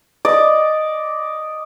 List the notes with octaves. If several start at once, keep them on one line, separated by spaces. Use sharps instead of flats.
D5 D#5